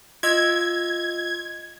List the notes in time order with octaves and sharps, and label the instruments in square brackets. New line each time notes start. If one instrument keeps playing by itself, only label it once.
[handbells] F4 D#5 E6 [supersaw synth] G#6